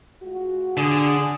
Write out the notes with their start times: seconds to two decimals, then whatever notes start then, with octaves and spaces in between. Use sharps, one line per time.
0.23 G#3 F4 F#4
0.77 D3 G#4